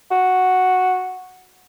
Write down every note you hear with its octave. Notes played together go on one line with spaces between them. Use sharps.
F#4